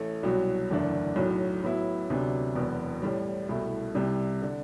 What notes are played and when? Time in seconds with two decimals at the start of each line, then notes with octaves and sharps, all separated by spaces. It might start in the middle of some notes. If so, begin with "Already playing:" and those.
Already playing: A1 A3
0.23 C2 B2 F#3
0.70 F#1 E2 D3 A3 D4
1.16 B1 A2 F#3
1.63 A2 F#3 B3 E4
2.10 D2 C3 F#3 B3 D4
2.55 E1 E2 B2 F#3 B3
3.02 A1 A2 G3
3.49 C2 B2 A3 E4
3.95 C2 C3 G3
4.42 D3